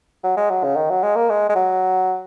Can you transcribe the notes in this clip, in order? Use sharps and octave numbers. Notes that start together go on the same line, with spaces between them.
F#3
G#3
F#3
C#3
D#3
F#3
G#3
A#3
G#3
G#3
F#3